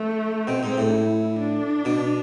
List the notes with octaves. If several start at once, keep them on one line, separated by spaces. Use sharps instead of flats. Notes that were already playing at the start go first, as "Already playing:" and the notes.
Already playing: A3
B2 C4
G#2
A2
E4
D4
B2